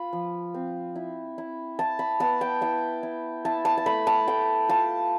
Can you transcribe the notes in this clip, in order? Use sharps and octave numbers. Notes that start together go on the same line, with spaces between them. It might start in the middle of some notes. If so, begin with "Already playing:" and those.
Already playing: F4 B5
F3
C4
E4
E4
E4 A5
B5
B3 A5
G5
E4 G5
E4
E4 A5
A5
A5
A3 B5
A5
A3 G5
F4 A5